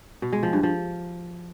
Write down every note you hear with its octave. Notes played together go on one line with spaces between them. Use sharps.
B2
G#3
F3
G2
F3